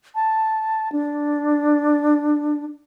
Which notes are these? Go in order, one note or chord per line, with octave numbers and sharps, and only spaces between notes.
A5
D4